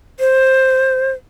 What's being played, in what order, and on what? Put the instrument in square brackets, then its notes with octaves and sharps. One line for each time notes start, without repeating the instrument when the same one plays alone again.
[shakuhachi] C5